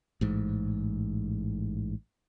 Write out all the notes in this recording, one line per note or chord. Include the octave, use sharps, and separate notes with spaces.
A1 G#2